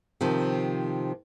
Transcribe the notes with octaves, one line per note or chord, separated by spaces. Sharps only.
C3 D#3 F3